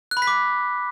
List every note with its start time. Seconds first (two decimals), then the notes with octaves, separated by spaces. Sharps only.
0.11 F#6
0.17 B5
0.22 B6
0.27 D6